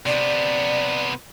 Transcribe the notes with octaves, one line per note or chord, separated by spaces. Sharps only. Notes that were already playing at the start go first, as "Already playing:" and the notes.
C3 B3 D5